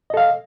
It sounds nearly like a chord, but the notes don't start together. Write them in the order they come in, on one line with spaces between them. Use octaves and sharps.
D#5 A4 F5